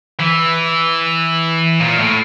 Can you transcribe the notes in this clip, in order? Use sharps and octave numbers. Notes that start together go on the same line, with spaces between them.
E3
A#2
A2